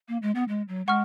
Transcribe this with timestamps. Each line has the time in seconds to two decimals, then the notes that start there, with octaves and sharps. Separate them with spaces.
0.08 A#3
0.22 G#3
0.35 B3
0.48 G#3
0.68 F#3
0.87 G#3 F#5 C#6 F6